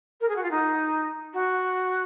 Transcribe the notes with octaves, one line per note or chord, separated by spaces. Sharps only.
A#4
G#4
F#4
F4
D#4
F#4